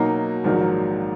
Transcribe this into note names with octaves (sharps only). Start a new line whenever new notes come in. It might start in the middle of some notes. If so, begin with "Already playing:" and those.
Already playing: B2 F#3 A#3 D#4
A#1 G#2 D#3 F#3 A#3